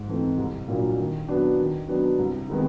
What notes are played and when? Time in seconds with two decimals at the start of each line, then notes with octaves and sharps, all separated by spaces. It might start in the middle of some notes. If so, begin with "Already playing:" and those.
Already playing: G#2
0.08 E3 A3 C4 D#4
0.38 C2
0.68 A#2 F#3 A#3 D4
0.98 D#3
1.28 F#3 B3 D4 F#4
1.58 D#3
1.88 F#3 B3 D4
2.19 C2
2.49 C3 D#3 G#3 B3